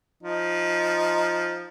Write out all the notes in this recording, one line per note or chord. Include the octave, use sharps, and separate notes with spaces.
F3 D#4